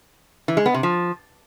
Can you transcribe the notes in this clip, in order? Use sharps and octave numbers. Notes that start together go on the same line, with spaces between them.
E3
G#3
B3
C3
F3